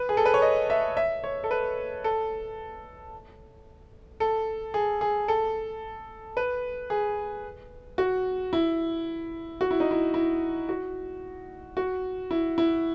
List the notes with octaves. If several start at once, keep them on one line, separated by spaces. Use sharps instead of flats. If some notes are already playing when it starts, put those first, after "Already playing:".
Already playing: B4
G#4
A4
B4
C#5
D#5
E5
E5
C#5
A4
B4
A4
A4
G#4
G#4
A4
B4
G#4
F#4
E4
F#4
E4
D#4
E4
E4
F#4
F#4
E4
E4